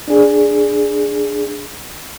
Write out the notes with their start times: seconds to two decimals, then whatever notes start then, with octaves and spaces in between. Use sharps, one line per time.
0.08 D4 G#4